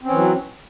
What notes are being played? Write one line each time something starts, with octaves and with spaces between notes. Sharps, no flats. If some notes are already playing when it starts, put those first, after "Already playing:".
E3 F#3 C4 C#4